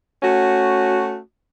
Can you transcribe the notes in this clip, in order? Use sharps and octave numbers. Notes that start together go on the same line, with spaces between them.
A3 C#4 F#4